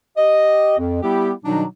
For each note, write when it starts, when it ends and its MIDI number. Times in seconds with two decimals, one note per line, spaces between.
0.17 0.77 67
0.17 0.77 75
0.78 1.00 41
1.03 1.32 55
1.03 1.32 59
1.03 1.32 64
1.03 1.32 67
1.45 1.64 47
1.45 1.64 51
1.45 1.64 54
1.45 1.64 55
1.45 1.64 62
1.45 1.64 63